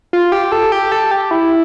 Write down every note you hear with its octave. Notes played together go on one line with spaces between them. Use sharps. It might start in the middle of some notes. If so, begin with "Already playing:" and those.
F4
G4
A4
G4
A4
G4
E4